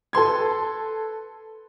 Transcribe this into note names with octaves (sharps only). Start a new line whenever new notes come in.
A4 B4 C6 G#6